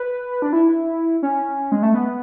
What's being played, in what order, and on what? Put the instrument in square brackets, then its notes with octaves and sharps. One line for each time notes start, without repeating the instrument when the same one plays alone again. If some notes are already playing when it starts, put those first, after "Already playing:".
Already playing: [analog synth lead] B4
D4
E4
C#4
G#3
A3
B3